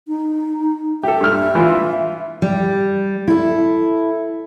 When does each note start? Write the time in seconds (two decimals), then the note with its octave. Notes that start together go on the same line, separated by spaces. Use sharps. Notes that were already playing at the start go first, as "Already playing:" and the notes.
0.08 D#4
1.03 G4 A4 E5
1.21 G2 F6
1.55 E3 F4
2.42 G3
3.28 E4 A4